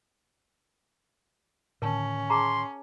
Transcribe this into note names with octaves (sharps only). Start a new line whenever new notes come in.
A2 D3 D#3 C#4 A#4 A5
G#4 A5 A#5 C6